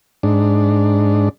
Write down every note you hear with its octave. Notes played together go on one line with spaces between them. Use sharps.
G#2 D4